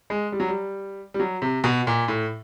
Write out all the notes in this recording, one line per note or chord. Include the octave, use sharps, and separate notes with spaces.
G#3
G3
F#3
G3
G3
F#3
C3
B2
A#2
A2